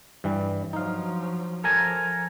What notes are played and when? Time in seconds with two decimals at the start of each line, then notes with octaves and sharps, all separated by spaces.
0.24 G2 E3 G3
0.73 F3 F#3 D#4 F5
1.64 F3 A4 A#4 G#5